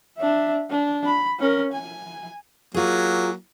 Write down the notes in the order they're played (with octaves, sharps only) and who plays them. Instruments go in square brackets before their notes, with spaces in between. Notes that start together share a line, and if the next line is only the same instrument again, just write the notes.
[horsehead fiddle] D4 E5
D4
B5
C#4 A#4
G#5
[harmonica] F#3 A#3 [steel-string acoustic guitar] F4 G#4